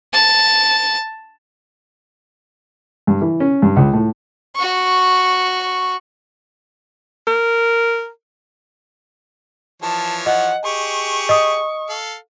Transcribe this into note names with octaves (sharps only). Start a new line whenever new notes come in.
A5
G2
E3
C#4
G2
C#2
A2
F#4 C#6
A#4
E3 F3 C#5 A5
D#5 F#5
G4 G#4 C#6
D#5 D#6
A4 F5